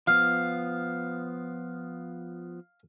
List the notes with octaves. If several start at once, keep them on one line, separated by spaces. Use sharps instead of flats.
F3 B3 F5